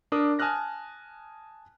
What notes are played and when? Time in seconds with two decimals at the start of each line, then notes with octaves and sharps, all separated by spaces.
0.12 D4 A#4 D6 D#6
0.39 G#5 A5 D#6 F6 F#6 A#6